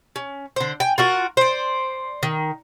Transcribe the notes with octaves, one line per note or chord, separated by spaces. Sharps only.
C#4
D3 C5
G5 G#5
F4 F#4 A#4
C5 D5
D#3